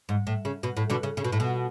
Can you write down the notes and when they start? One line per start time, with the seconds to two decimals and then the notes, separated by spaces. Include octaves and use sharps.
0.09 G#2
0.27 A2
0.45 C#3
0.63 B2
0.77 A2
0.90 B2 D3
1.03 C#3
1.17 C#3
1.24 B2
1.32 A2
1.40 B2